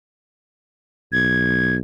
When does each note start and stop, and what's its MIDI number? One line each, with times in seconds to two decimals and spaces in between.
1.12 1.81 35
1.12 1.75 92